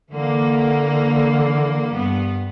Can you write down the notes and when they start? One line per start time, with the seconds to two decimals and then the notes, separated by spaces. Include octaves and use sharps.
0.11 D3 E3 A#3
1.92 G2 B3